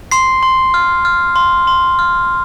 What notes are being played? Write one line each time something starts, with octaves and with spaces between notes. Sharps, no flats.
C6 C7
C6
F6
F6
C6
C6
F6